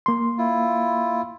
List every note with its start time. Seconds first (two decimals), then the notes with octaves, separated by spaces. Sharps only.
0.06 A#3 C6
0.38 E4 F4